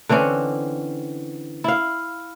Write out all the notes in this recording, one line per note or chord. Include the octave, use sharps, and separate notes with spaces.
D3 E3 C4 C#4
E4 F5